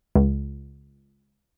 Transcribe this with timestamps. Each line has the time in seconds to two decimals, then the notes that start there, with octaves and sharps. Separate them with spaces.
0.16 C#2